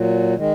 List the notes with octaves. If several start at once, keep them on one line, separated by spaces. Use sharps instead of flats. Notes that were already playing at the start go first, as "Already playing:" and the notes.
Already playing: A#2 F#3
D#3 G#3